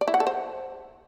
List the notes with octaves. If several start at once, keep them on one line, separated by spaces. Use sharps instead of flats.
D5
E4
F#5
A4
C5